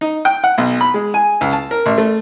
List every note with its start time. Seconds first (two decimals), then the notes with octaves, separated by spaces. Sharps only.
0.01 D#4
0.25 G5
0.44 F#5
0.58 B1
0.81 B5
0.94 G#3
1.14 G#5
1.41 C#2
1.53 A5
1.71 A#4
1.86 A1
1.98 A3